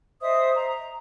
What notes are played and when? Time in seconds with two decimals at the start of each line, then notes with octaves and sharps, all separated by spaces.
0.22 C5 D#5 E5 D#6
0.56 A#5